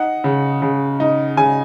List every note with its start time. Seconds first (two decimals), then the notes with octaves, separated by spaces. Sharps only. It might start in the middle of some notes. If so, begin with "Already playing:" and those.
Already playing: D#4 F#5
0.24 C#3
0.62 C#3
1.00 D#4
1.37 C#3 G#5